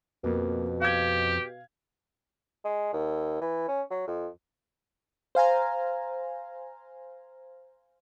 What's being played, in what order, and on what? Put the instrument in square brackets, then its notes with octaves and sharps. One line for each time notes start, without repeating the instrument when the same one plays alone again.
[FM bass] F2 [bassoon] B2 [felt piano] A#3
[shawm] G4 [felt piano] F5 G#6
[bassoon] G#3
D#2
E3
C#4
F#3
F2
[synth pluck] C5 F5 G#5 A#5